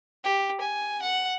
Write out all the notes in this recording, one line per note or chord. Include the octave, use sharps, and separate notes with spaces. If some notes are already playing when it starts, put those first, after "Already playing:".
G4
G#5
F#5